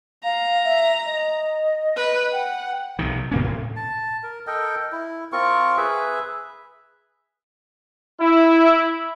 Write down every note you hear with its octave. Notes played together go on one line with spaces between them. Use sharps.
F5 A#5
E5
D#5
B4
F#5 G5
B1 C3 D#3
A#2 A#3 C#4
A2
A5
A#4
A4 A#4 D#5 G5
E4
C4 F4 A#4 C#6
G#4 B4 E5
E4